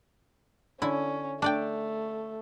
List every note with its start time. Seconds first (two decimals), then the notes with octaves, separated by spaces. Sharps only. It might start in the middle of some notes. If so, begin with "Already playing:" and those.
0.82 D3 C#4 E4
1.42 A3 D4 D5 G5